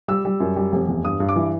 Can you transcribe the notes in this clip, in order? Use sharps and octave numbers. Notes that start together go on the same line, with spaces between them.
G3 E6
G3
F#2
G3
F1
E2
G2 D#6
G2
D6
E3